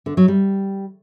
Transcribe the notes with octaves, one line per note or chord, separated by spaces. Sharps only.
D3
F#3
G3